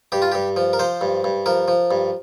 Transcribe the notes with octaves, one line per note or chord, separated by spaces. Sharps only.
G2 G4
F4
G2 G4
F3
A#4
F3 C5
G2
G2
F3 A#4
F3
G2